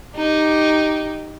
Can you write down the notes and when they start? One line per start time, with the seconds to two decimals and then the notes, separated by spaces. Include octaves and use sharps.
0.16 D#4 G4